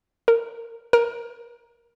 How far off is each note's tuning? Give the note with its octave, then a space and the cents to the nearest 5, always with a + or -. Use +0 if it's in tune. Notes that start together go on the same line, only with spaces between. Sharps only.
A#4 -15
A#4 +15